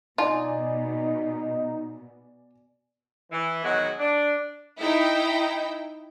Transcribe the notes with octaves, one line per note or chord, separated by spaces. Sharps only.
B2 D#4 F4 D5 G#5
E3
B2 D#3 F#3 G#3 B3 F#4
D4
D#4 E4 G5